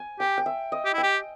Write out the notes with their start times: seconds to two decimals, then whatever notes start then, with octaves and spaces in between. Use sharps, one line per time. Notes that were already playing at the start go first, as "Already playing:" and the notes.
Already playing: G#5
0.19 G4 G5
0.38 G5
0.46 E5
0.72 D#5
0.85 G4
0.94 E4 G5
1.03 G4